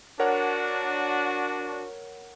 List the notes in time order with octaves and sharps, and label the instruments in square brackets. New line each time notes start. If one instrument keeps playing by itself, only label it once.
[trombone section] D4 F#4 [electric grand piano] A#4 C#5 F#5